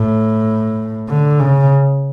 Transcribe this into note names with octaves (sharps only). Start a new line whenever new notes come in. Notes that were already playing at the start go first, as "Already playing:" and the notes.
Already playing: A2
D3
C#3